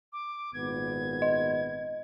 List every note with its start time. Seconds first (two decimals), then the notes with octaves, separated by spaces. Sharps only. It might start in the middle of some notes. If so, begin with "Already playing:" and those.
0.13 D6
0.54 G#1 A#2 B3 G#6
1.22 D#5